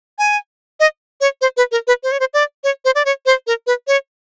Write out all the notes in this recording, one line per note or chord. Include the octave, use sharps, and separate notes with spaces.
G#5
D#5
C#5
C5
B4
A#4
B4
C5
C#5
C5
D5
C#5
C5
D5
C#5
C5
A#4
B4
C#5